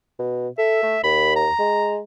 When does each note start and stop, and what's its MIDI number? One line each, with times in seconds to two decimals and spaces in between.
0.19 0.48 47
0.58 0.82 69
0.58 1.01 76
0.83 0.97 57
1.04 1.48 39
1.04 1.35 83
1.36 1.98 82
1.59 1.99 56